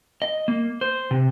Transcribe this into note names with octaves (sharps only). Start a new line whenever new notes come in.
D#5
A#3
C5
C3